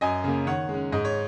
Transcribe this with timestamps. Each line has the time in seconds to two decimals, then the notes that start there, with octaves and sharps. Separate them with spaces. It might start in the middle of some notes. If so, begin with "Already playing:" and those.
0.01 F#2 D#5 G#5
0.24 C#3 A#3
0.47 D#3 C#5 F#5
0.69 G#3
0.74 C#4
0.92 G#2 D#5
1.05 C#5